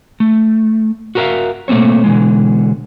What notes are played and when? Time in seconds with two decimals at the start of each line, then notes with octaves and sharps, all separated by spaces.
0.20 A3
1.15 F#4 G4 A#4 C5 E5 F5
1.68 B2 A3 A#3 C4 C#5
2.04 B2 D3 E3 G#3